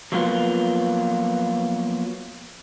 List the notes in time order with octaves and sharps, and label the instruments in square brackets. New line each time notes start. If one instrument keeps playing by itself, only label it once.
[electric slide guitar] F3 F#3 A#3 B3 F4